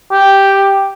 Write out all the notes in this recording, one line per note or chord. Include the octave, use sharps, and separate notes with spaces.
G4